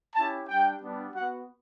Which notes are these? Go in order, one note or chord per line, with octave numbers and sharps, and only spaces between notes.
C#4 E4 G4 A5
G3 D4 G4 G5
G3 B3 D4
B3 F#4 F#5